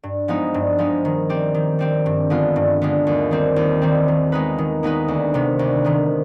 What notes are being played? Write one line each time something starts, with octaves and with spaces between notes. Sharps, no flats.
G2
F3 G#3 B3 D#4
G2
F3 G#3 B3 D#4
D#3
G3 C4 G4
D#3
G3 C4 G4
G2
D3 G#3 B3 F4
G2
D3 G#3 B3 F4
D#2
D#3 G3 C4
D#2
D#3 G3 C4
D#3
G#3 B3 D#4 B4
D#3
G#3 B3 D#4 B4
D2
C3 D#3 B3
D2
C3 D#3 B3